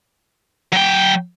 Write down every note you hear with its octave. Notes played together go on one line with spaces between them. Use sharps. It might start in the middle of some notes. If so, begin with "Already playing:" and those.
F#3 G5